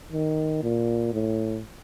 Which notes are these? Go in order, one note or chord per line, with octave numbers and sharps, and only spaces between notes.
D#3
A#2
A2